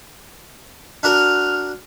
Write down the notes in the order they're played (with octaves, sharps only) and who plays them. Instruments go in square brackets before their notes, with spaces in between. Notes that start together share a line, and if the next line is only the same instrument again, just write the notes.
[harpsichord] D4 F#4 A#4 [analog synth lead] F6